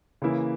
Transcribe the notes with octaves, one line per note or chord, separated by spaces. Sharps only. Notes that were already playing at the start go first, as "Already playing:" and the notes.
C#3 E3 A#3 E4